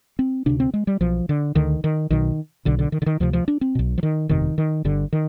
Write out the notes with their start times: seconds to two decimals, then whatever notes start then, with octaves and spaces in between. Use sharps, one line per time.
0.19 C4
0.46 D2 C3 D4
0.60 C4
0.74 G#3
0.87 G3
1.01 B1 B2 F3
1.29 D3
1.55 D2 D3 D#3
1.84 D#3
2.10 B1 B2 D#3
2.65 B1 B2 D3
2.79 D3
2.92 D#3
3.02 D3
3.06 D#3
3.20 D2 C3 F3
3.33 F3
3.48 D4
3.61 C4
3.75 B1 B2
3.98 F3
4.03 D#3
4.29 G1 F2 C3 D#3
4.58 D#3
4.84 G1 G2 D3
5.13 D#3